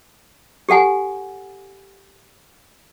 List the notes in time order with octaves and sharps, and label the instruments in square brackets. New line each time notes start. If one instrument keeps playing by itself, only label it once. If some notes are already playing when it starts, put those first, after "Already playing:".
[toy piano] G4 A4 F#5 G#5